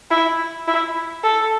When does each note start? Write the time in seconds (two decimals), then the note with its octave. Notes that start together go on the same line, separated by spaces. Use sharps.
0.11 E4
0.68 E4
1.23 A4